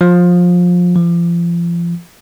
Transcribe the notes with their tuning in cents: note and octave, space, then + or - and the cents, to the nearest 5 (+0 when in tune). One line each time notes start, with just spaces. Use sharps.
F3 +20
F3 -35